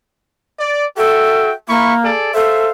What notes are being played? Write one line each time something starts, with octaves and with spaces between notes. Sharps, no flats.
D5
F#4 A4 E5 G5
A#3 E4 B5 C#6
G#4 A4 D5
A4 C5 E5 F5